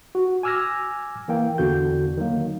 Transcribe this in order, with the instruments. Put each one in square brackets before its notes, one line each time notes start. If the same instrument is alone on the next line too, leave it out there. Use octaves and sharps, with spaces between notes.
[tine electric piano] F#4
G#5 D6 E6 F6 G#6 A#6
E3 A#3 G5
E2 D3 F#4 G6
D#3 F#3 A#3